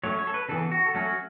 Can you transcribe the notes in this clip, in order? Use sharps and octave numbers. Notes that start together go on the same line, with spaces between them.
F#3 A3 C#4 C#5
C#5
A4
B4
C#3 E3 B3 A4
F#4
A4
F#3 A3 C#4 F#4